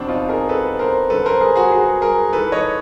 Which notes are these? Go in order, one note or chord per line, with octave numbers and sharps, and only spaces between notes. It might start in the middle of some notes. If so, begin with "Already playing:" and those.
Already playing: E2 B2 C4 D4
D#4 F4
G#4 A#4
A4 B4
A#4 C5
F#2 D3 A4 B4
A#4 C5
G#4 A#4
F#4 G#4
F#4 G#4
G#4 A#4
G#2 E3 A4 B4
C#5 D#5